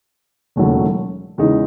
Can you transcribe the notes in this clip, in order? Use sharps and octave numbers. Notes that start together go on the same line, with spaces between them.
E1 D#2 C#3 F#3 A3
E2 C#3 G#3 D#4